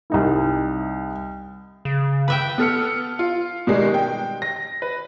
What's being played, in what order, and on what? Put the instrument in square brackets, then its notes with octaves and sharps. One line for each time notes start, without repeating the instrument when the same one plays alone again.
[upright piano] C2 D#4 E4
[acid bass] C#3
[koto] B4 E5 G5
[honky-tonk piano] B3 A4 F6 C#7
F4
B2 D#3 G3 G#3 B3
G5
A#6
B4